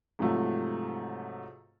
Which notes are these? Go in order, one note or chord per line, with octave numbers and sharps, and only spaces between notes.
G#2 C3 F3 F#3 A3 F4